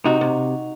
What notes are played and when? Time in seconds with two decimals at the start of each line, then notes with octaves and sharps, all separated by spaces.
0.05 C3 D#4 F#4
0.21 C3